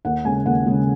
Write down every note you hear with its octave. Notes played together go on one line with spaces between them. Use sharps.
D#2 F#5
C#3 G#3 G#5
D#2 F#5
C#3 G#3